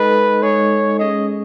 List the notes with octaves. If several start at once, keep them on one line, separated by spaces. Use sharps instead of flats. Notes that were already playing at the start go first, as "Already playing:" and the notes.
Already playing: G#3 D#4 A4 B4 D#5
G#3 D#4 A4 C#5 D#5
G#3 C#4 G#4 D#5